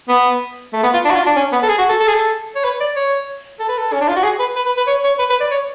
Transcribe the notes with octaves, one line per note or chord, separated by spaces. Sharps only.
B3
A3
B3
F4
D4
F#4
F4
D4
C#4
B3
A4
G#4
F#4
A4
A4
G#4
A4
C#5
B4
D5
C#5
A4
B4
A4
C#4
D4
F4
F#4
G#4
B4
B4
B4
B4
C#5
C#5
B4
B4
D5
C#5